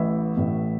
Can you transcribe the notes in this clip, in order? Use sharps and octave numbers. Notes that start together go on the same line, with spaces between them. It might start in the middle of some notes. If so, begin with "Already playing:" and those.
Already playing: A1 A2 E3 E5
A1 A2 E3